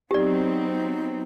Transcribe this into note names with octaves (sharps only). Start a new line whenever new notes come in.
F#3 B3 C4 D#4 G4 D5